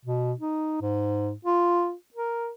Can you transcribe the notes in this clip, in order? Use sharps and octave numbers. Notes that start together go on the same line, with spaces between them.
B2
D#4
G#2
F4
A#4